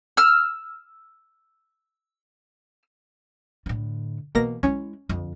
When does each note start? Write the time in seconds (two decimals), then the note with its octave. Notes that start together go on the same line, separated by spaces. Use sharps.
0.17 E6 F6
3.66 A2 D3
4.35 B2 E3 A#3 A#6
4.63 G#3 C#4 E4
5.09 F2 D3